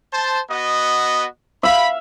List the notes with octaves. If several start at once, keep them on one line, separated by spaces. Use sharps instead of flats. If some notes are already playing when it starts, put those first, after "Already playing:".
C5 A5
B3 F#4 D#5
E5 F5 B5